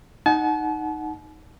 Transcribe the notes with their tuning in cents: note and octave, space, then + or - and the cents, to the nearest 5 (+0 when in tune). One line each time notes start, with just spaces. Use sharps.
D#4 +0 F#5 +0 A5 -45